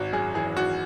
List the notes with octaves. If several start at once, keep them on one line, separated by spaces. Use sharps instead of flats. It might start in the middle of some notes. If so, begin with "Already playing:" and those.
Already playing: G#1 F#4
F#2 G#4
E3 G#4
G#1 F#4